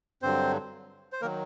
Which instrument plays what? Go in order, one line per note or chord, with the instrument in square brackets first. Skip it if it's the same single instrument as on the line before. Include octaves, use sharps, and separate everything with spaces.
[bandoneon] G2 D3 F#3 C4 C5
C5
D#3 F#3 A#3 A#4